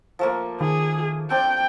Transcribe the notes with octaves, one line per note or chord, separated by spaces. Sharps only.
F3 A3 A#3
D#3 G#4
C4 D4 G5